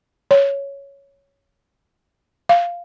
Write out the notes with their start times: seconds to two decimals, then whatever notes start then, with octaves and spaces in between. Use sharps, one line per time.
0.31 C#5
2.49 F5